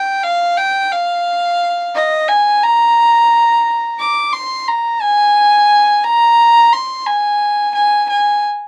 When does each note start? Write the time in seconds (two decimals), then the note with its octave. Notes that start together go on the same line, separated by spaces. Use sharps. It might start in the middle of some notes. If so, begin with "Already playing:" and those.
Already playing: G5
0.23 F5
0.57 G5
0.93 F5
1.95 D#5
2.28 G#5
2.63 A#5
4.00 D6
4.33 C6
4.68 A#5
5.02 G#5
6.05 A#5
6.73 C6
7.07 G#5
7.75 G#5
8.10 G#5